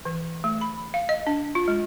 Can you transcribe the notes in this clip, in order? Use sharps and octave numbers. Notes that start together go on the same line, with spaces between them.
E3
A3
B5
F5
D#5
D4
F4
G#3